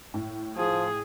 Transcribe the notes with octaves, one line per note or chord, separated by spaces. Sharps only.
A2
F3 G#4